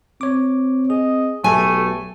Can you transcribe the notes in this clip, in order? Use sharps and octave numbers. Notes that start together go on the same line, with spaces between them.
C4 C#5 D6
G#4 D#5
B1 F#3 A3 G4 G#5